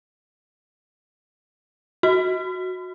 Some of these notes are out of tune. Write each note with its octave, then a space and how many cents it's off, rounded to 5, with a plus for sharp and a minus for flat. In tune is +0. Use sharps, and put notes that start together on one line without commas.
F#4 -10